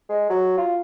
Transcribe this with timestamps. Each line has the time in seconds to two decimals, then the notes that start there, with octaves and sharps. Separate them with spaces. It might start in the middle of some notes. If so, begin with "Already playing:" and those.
0.09 G#3
0.30 F#3
0.57 F4